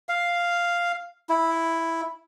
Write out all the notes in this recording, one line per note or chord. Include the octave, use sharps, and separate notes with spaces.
F5
E4